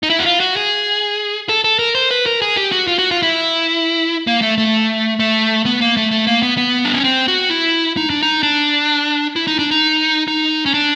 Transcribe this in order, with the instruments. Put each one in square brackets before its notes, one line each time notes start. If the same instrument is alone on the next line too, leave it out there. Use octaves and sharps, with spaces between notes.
[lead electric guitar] D#4
E4
F#4
F4
F#4
G#4
A4
A4
A#4
C5
B4
A#4
G#4
G4
F#4
F4
F#4
F4
E4
A#3
A3
A3
A3
B3
A#3
A3
A3
A#3
B3
B3
D4
C#4
C4
F#4
E4
D#4
D4
D#4
D4
E4
D#4
D4
D#4
D#4
C#4
D4